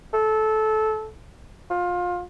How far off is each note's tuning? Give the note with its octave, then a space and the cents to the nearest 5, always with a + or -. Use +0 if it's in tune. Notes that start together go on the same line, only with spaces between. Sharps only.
A4 -20
F4 +25